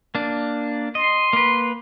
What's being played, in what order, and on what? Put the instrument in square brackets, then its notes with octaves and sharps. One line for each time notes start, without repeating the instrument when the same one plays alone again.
[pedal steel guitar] A#3 D4
[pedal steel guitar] D#5 [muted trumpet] C6
[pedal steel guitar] A#3 B4